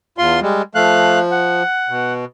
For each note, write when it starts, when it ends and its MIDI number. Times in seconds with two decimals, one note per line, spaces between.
0.18 0.40 40
0.18 0.40 65
0.18 0.40 84
0.42 0.62 55
0.42 0.62 56
0.75 1.63 53
0.75 1.19 57
0.75 1.19 77
0.75 1.19 90
1.31 2.13 78
1.89 2.25 47